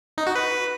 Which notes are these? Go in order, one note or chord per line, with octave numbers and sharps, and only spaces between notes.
D#4
F#4
B4